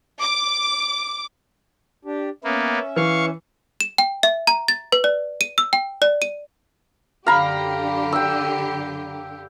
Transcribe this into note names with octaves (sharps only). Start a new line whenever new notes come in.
D6
D4 G4
A#3 B3 C#4 E5
E3 F5 C#6
E7
G5
E5
A#5
A6
B4
D5
D#7
E6
G5
D5
D#7
F#2 D3 G4 F5 A#5 B5
G5 E6